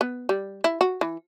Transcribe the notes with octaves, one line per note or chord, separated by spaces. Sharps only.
B3
G3
E4
F#4
E3